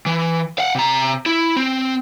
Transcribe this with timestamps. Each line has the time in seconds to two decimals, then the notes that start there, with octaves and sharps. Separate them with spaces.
0.06 E3
0.58 F5 F#5
0.75 C3 A#5
1.26 E4
1.57 C4